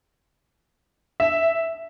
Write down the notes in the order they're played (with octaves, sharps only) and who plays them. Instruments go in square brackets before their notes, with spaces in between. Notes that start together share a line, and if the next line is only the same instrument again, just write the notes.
[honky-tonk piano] E5